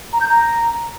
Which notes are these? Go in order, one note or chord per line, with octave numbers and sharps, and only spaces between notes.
A#5
G6
A#5